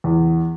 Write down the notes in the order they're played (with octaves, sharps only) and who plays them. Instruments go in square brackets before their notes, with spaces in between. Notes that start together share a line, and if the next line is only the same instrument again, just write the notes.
[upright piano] E2